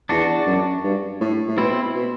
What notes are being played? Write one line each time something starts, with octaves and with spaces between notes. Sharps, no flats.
E2 D4 F#4
F#2
G2
A2
A2
B2 C4 E4
B2